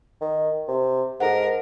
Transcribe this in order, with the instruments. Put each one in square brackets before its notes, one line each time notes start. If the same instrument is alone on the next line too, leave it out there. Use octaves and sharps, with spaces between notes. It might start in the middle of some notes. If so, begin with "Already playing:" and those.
[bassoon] D#3
C3
[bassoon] G#2 [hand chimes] A4 F#5 [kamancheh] A#4